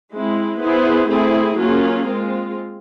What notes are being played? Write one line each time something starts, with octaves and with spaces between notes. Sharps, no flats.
G#3 C4 E4
B3 E4 G#4 C5
A3 C4 E4 G#4
F#3 A#3 C#4 F4 G#4
G#3 C4 F4